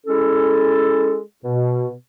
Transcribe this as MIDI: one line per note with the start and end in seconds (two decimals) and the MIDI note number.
0.07 1.19 56
0.07 1.19 61
0.07 1.19 64
0.07 1.19 69
1.45 1.90 47